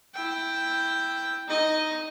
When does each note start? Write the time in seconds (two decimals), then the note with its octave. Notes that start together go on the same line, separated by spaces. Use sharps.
0.14 E4 G5
1.48 D#4 D#5